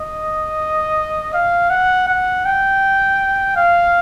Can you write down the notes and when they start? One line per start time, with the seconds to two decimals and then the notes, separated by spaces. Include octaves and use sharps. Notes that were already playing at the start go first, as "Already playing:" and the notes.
Already playing: D#5
1.34 F5
1.70 F#5
2.08 F#5
2.46 G5
3.57 F5